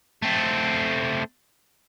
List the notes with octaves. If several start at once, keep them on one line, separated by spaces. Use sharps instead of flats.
A3 C4